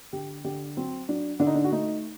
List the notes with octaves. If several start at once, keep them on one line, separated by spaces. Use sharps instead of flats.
D3 G4
D3 G4
F#3 C4
F#3 D4
D3 D4
D#4
D4
F#4
A3 D#4